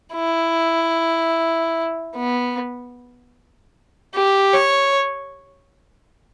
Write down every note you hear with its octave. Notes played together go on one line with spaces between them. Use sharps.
E4
B3
G4
C#5